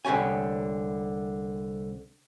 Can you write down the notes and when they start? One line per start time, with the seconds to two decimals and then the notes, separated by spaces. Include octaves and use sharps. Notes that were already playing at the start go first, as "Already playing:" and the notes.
0.05 C2 D3 G4 C#5 G#5